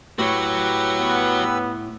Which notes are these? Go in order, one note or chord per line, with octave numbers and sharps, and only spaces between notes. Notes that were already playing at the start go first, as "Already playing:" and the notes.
A2 F#4 G4 B4 C#5 E6
B3